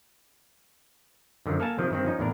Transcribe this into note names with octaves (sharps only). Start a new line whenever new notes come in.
F#2 D3 D#3 F3
A#3 A4 F5 G#5 A5
C3 D#3 F3
G2 D#3 C4
F3 C#4 D#4
E2 A2 D4 A#4